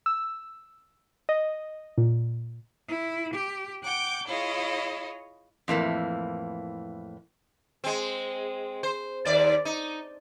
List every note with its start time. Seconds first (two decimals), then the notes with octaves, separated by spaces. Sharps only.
0.06 E6
1.29 D#5
1.98 A#2
2.88 E4
3.33 G4
3.81 F#5 G5 D6 G6
4.26 E4 F4 G#4 C#5 D#5
5.68 F2 A2 E3 A#3
7.84 G#3 C4
8.83 C5
9.25 D#2 D5
9.65 D#4